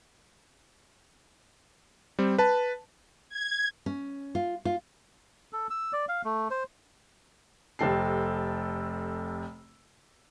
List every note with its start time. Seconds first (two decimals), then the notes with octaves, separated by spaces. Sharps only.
2.19 G3 C4
2.38 B4 A5
3.29 G#6
3.86 C#4
4.35 F4
4.65 F4
5.53 A4
5.70 E6
5.93 D5
6.09 F5
6.24 A3
6.51 C5
7.79 F1 C3 C4 A4 E6 C7